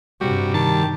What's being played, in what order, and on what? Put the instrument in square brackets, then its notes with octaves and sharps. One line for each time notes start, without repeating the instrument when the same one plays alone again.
[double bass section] G2 C3 [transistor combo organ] G3 [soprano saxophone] F#4
[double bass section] C3 [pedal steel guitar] D#3 [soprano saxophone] A5